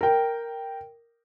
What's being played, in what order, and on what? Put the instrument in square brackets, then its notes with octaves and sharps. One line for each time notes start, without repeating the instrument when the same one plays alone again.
[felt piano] A#4 G5